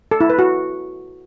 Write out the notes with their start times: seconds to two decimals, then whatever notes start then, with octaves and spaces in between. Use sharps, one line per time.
0.11 A4
0.21 E4
0.30 B4
0.39 F#4